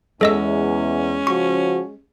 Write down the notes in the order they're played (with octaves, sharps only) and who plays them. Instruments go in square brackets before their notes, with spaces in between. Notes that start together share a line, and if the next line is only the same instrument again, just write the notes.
[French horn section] E2 [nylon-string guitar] G#3 [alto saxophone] C#4 [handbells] A4 D#5 E6
[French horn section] C#3 F3 F#4 [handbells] C#6